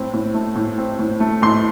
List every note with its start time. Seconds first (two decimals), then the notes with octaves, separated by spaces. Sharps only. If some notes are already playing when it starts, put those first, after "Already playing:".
Already playing: A2 C4
0.13 A2
0.34 A3
0.56 A2
0.78 C4
0.99 A2
1.20 A3
1.42 A2 C6